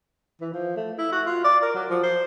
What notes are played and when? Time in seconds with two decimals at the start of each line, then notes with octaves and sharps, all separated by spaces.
0.41 E3
0.53 F3
0.76 A3
0.98 E4
1.12 F#4
1.26 F4
1.44 D5
1.62 A#4
1.75 F#3
1.90 F3
2.03 C5